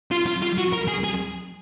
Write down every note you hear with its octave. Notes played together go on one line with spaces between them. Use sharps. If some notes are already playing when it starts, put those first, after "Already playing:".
F4
F4
F4
F#4
A#4
G#4
G#4